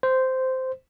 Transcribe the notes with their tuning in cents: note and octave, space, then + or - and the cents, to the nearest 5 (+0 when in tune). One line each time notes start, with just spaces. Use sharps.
C5 -10